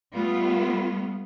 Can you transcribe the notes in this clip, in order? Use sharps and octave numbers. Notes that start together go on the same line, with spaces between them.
G3 A3 B3 F4